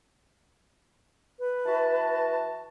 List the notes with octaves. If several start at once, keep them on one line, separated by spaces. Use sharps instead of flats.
B4
E3 F#4 A5